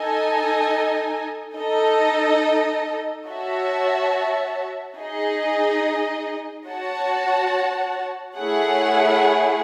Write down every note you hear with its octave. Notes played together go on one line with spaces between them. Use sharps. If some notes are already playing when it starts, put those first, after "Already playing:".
Already playing: D#4 A4 D#5 G#5
D#4 A4 D#5
F#4 C#5 E5 A5
D#4 G#4 D#5
F#4 C#5 F#5 A5
A3 E4 G#4 C#5 F#5